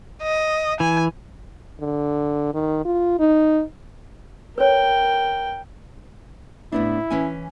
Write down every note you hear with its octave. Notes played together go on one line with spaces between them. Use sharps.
D#5
E3 G#5
D3
D#3
F4
D#4
A#4 B4 C#5 G5
A2 B3 D4 E4
E3 C#4 G#5